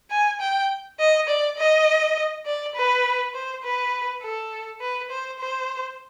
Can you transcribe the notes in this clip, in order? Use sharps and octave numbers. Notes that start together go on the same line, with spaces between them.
G#5
G5
D#5
D5
D#5
D5
B4
C5
B4
A4
B4
C5
C5